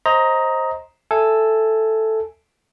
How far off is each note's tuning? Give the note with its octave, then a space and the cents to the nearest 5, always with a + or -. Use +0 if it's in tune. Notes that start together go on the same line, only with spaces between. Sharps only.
C5 +15 D#5 +15 A#5 +0
A4 +0 E5 +0 G#5 +0